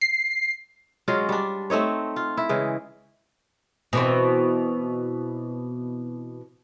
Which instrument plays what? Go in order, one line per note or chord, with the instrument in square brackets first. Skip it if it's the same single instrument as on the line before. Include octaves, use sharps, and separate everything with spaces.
[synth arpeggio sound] C7
[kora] F#3 G#3 C#4 F4
G3 D4
A3 C4 D#4 C#5
F4
E4
C#3 E3 G#3
[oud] B2 E3 C4